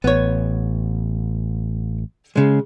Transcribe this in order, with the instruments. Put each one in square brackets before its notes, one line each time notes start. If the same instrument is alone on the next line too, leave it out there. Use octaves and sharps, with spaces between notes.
[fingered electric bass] A1 [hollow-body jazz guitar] B3 C#5
[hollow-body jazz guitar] C#3 G#3